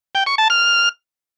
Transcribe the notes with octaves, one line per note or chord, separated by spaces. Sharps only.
G5
C#6
A5
F6